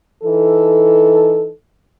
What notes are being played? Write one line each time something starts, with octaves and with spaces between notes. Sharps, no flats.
E3 D#4 A4